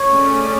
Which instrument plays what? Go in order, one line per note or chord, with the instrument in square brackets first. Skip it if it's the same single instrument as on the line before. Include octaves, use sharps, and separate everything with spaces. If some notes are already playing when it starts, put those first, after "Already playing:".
Already playing: [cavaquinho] C#5
[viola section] A3 C#4 G#4 D5